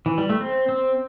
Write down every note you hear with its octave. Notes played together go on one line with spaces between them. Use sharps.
E3
G3
A3
C4
C4